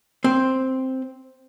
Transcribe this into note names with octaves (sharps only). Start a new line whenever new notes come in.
C4